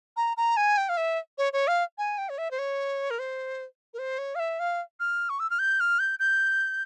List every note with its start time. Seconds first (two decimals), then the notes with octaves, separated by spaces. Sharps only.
0.17 A#5
0.37 A#5
0.57 G#5
0.77 G5
0.89 F5
0.97 E5
1.38 C#5
1.53 C#5
1.68 F5
1.98 G#5
2.18 G5
2.29 C#5
2.38 E5
2.51 C5
2.59 C#5
3.10 A#4
3.19 C5
3.94 A#4
3.99 C5
4.18 C#5
4.35 F5
4.39 E5
4.59 F5
5.00 F6
5.29 C#6
5.40 E6
5.50 F6
5.59 G6
5.80 F6
5.99 G6
6.19 G6